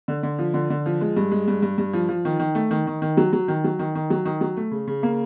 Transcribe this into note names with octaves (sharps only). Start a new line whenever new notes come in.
D3
D3
F3
D3
D3
F3
G#3
G2
G#3
G2
G2
G2
F3
F3
D#3
D#3
A3
D#3
D#3
D#3
F#3
F#3
D#3
F#3
D#3
D#3
F#3
D#3
F#3
A3
C#3
C#3
A#3